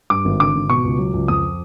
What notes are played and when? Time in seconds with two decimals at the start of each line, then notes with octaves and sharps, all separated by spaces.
0.10 G2 D6
0.25 G#1
0.40 D3 D6
0.55 G#1
0.69 B2 C#6
0.84 C#2
0.98 F#3
1.13 C#2
1.28 F2 D#6